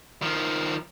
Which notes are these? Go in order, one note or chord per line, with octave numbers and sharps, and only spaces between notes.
D#3 F3